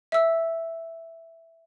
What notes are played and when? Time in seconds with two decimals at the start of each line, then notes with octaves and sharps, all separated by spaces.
0.12 E5 E6